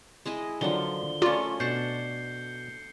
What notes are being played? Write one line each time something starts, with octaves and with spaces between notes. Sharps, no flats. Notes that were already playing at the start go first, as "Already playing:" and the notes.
G#3 E4 D#5
D3 D#3 F3 F#3 D4 G7
A3 C#4 F4 A#4 D5
B2 D4 F#5 G6 C7 C#7